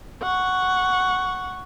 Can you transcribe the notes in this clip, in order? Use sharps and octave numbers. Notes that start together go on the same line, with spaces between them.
F#5 C#6